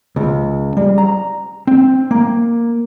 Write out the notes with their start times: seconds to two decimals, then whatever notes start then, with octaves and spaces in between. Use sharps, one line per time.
0.16 C#2
0.77 G3
0.98 A#5
1.67 C4
2.11 A#3